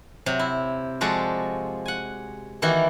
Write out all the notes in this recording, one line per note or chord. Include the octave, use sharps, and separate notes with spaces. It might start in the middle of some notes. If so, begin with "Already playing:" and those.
C3 F#3
E4
F3 G#3 F#4 A4 D5
F#5 G#5
D#3 E3 A#3 E4 F#4